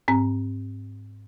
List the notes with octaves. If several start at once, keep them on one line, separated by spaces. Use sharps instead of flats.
G#2 C4 A#5